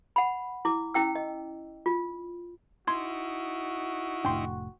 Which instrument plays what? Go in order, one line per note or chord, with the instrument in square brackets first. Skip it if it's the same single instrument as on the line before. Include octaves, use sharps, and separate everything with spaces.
[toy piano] F#5 B5
E4 D6
C#4 E4 G5 E6
D#5
F4
[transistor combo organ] D#4 E4 [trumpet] F#4 [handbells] C6 G#6
[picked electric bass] F1 A2 D4 [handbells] G5 C6